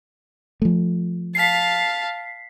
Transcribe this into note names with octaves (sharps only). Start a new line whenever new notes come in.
F3 A3
F5 A5 B6 C7